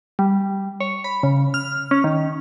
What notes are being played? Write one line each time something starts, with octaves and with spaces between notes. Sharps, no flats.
G3
C#5
B5
C#3
F6
C#4
D#3